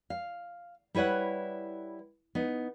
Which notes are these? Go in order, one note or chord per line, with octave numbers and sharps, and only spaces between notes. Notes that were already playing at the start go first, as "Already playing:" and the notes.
F5
G3 E4 B4 C#5 F#5
B3 D#4